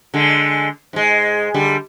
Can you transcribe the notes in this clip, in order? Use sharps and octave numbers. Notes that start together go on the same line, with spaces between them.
D3 G#3
G#2 G#3
D3 G3